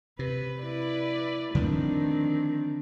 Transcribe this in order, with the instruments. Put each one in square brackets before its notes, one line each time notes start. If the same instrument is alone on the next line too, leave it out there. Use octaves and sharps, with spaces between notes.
[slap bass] C3 [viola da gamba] B4
[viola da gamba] E4 B4 D5
[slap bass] D3 F3 A3 [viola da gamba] D#3 C4 D4